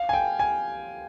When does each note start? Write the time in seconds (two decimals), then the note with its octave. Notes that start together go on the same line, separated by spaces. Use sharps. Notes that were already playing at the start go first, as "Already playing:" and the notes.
Already playing: F5
0.09 G#5
0.13 G5
0.39 G#5